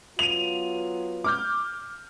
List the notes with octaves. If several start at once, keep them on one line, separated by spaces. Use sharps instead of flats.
F#3 B3 F4 D#7 F7
D6 F6 G6